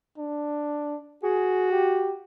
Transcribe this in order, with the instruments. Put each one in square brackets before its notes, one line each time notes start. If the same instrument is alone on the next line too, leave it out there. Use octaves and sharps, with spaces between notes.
[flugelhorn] D4
[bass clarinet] F#4 [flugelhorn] G#4
[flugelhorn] G4